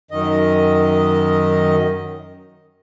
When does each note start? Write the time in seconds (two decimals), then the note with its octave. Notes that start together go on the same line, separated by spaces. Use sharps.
0.11 F#2 D#3 D#5